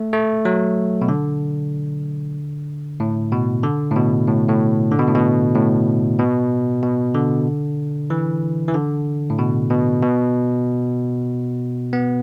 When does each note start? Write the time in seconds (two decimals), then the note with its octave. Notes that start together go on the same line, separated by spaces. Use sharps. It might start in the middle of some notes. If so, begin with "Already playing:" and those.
Already playing: A3
0.13 A3
0.45 F#3
1.02 B2
1.08 D3
3.00 A2
3.32 B2
3.63 D3
3.91 A2
3.96 B2
4.27 A2
4.48 A2
4.92 D3
4.99 B2
5.08 A2
5.15 B2
5.55 A2
6.19 B2
6.83 B2
7.15 D3
8.10 E3
8.68 E3
8.74 D3
9.30 A2
9.39 B2
9.71 B2
10.02 B2
11.93 B3